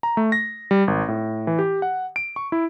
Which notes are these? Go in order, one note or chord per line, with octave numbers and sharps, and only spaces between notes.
A#5
A3
A#6
G3
G#1
A2
E3
G4
F#5
D7
C#6
E4